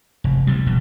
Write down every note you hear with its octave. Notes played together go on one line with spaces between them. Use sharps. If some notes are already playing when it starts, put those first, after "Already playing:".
F1
C3 G3
E1 B2